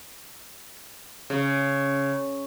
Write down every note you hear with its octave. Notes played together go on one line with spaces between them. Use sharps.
C#3